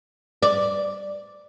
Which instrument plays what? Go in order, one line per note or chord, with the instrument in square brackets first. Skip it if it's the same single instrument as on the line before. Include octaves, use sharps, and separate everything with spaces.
[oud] D5